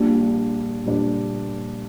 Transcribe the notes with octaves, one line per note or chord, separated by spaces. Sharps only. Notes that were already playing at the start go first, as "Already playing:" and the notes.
Already playing: A#1 A#2 G3 D4
A#1 A#2 G3 D4